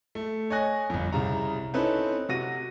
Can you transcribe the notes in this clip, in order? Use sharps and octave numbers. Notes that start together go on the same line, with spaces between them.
A3
C#5 D#5 G#5 F#6 A#6
G1 F2
C2 C#3 A#5
C4 C#4 D#4 E4 A4 B4
C3 F#4 A#6 D#7